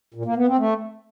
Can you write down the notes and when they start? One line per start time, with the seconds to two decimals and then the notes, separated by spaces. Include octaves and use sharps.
0.14 A#2
0.25 A#3
0.36 B3
0.47 C4
0.58 A3